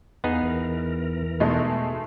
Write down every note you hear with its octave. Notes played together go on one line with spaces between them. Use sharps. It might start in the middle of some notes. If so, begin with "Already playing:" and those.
E2 B3 D#4 G#4 F5
E2 E3 A#4
B2 G#3 A3 D#4